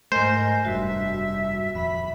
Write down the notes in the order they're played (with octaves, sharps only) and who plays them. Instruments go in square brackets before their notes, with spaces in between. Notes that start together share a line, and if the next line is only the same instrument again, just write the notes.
[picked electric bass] G#2 A3 [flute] A#4 [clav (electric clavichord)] C5 [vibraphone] D#5 G#5
[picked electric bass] F1 G2 G3 [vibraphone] F#4 [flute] E5
[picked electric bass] D#1 F2 [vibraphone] E5 [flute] B5